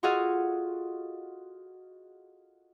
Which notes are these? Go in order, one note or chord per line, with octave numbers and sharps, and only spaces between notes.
F4 F#4 G#4 A4 D#5 F5